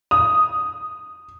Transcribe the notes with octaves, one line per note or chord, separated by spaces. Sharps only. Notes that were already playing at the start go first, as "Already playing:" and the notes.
D#6